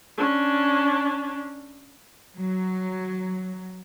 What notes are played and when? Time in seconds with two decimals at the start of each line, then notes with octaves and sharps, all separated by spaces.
0.18 C#4 D4
2.36 F#3